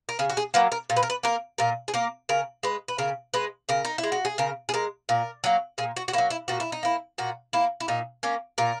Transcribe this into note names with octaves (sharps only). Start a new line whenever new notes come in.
A#4
C#3 G#4
F#4
G#4
F#3 A#3 B4
A#4
A#2
B4
A#4
B4
A#3 A#4
A#2 A#4
G#4
A#3 A#4
C#3 A#4
G#3 B4
B4
C#3 A#4
G#3 B4
C#3 A#4
D#4
E4
G#3
F#4
G#4
C#3 A#4
G#4
G#3 A#4
A#2 A#4
F#3 A#3
A#2 G#4
F#4
F#4
F#3 A#3 E4
E4
A#2 F#4
E4
D#4
A#3 E4
A#2 F#4
A#3 E4
E4
A#2 D#4
A#3 C#4
A#2 A#4